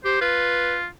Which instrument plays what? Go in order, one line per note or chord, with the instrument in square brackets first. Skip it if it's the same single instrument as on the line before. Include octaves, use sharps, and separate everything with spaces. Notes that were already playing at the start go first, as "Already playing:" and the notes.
[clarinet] G4 [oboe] C5
[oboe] F4 [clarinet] B4